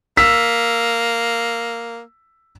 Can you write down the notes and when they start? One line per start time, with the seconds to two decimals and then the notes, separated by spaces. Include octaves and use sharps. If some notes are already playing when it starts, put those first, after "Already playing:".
0.17 A#3 E6 B6 E7